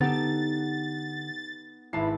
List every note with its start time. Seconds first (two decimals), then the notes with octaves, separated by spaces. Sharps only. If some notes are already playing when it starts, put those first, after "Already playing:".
0.01 D3 B3 D#4 G4 A4 F#5 A6
1.93 G#1 E4 B4 A5 C7